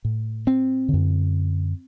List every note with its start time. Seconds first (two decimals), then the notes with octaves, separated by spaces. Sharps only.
0.05 A2
0.47 C4
0.88 F#2 D3